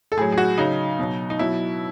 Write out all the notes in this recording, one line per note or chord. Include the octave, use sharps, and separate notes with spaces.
A4
A2 F#3 G#4
G#4
F#4
C#3 F#3 D#4
B2 F#3
D#4
B2 F#3 E4